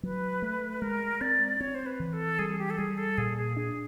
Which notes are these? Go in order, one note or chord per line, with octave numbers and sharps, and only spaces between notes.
F#3 B4
A3
G#3 A#4
C4 D5
C4 C#5
C5
B4
E3
A4
G3 G#4
G4
A4
G3 G#4
A4
A#2 G#4
G#4
D4 G#4